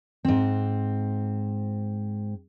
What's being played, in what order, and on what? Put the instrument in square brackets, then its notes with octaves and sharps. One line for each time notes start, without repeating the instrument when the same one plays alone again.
[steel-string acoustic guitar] G#2 C4